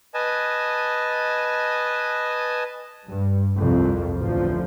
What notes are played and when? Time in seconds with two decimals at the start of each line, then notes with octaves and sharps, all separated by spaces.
0.14 B4 D#5 G#5 A5
3.07 G2
3.57 C2 F2
4.16 A1 D2 F3